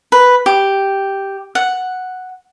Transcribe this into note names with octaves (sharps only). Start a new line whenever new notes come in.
B4
G4
F#5